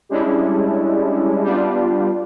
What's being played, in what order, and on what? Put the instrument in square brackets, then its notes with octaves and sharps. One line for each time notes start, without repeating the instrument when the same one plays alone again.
[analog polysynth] G3 G#3 C#4 D4 E4
G3 B3 D4 F4